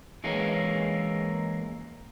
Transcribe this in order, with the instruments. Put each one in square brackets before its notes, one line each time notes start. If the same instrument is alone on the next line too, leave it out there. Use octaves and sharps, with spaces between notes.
[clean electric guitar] E3 G#3 A#3 C#4